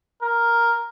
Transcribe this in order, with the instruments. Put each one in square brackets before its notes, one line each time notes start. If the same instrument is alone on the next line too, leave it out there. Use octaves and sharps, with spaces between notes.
[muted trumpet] A#4